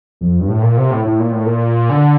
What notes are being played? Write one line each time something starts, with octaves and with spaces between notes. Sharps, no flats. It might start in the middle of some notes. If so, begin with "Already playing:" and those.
F2
G2
A2
A#2
C3
A2
A2
A#2
A2
A#2
D3